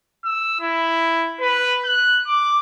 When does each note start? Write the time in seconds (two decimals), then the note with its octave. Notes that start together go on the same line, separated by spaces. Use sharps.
0.25 E6
0.60 E4
1.40 B4
1.84 F#6
2.27 D6